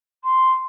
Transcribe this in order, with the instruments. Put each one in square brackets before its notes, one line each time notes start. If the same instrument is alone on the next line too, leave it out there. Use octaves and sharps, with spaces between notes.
[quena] C6